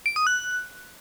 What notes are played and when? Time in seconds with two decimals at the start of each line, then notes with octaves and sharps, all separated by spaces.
0.06 D7
0.16 D#6
0.27 F#6